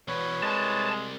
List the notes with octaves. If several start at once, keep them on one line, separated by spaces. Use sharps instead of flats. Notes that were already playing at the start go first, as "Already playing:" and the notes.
E2 B2 B4 C#5
C2 G#3 A5